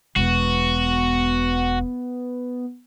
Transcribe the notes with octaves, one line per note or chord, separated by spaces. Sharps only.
E1 B3 F#4